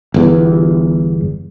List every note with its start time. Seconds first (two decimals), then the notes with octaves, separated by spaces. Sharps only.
0.14 G1 E2